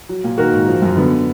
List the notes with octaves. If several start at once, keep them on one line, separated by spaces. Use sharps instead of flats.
F#3
A#2
D#3 F#4 A#4
G#2
F3
F#2
D3 B3